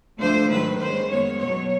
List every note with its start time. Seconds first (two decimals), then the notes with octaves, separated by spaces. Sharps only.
0.19 D2 D3 F3 A3 C5
0.48 G#2 D#3 F#3 B4
0.78 D#2 D#3 G#3 C#4 C5
1.08 F#2 D#3 G#3 B3 C#5
1.37 B2 F#3 B3 C#5